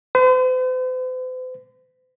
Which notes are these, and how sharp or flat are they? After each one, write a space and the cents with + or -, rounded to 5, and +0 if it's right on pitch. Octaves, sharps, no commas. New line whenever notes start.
C5 -45